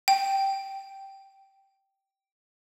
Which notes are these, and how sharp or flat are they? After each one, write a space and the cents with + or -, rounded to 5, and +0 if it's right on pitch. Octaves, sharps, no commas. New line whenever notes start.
G5 -10